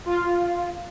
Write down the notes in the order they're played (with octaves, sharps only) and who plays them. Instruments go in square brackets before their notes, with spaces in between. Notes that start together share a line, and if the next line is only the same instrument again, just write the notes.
[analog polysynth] F4